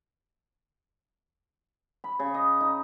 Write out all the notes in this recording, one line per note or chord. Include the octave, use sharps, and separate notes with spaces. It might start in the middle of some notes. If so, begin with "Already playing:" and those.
B5
C#3
D#5
D#4